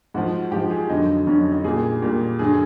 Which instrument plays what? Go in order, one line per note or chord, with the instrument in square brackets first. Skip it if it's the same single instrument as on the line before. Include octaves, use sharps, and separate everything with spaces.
[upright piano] G#2 F3 F#4
G#2 F3 G4
G#4
F2 D3 F#3 D#4
F2 D3 F#3 C#4
D#4
D#4
A#2 G3 G#4
A#2 G3
F#2 D3 F#3 G#4